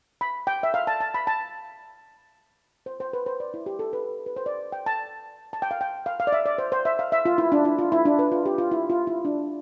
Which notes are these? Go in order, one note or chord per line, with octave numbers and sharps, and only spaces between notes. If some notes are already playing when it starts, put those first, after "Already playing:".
B5
G5
E5
F5
A5
A5
B5
A5
C5
C5
B4
C5
D5
E4
G4
A4
B4
B4
C5
D5
G5
A5
A5
G5
F5
G5
F5
F5
D5
E5
D5
C5
C5
E5
F5
E5
F4
E4
D4
E4
F4
E4
D4
B4
F4
G4
F4
E4
F4
E4
D4